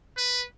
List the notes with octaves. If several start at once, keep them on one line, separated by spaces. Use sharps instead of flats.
B4